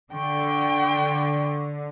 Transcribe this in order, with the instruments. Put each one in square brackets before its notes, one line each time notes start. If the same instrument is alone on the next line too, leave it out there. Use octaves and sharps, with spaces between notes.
[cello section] D3 [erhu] G5 [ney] C#6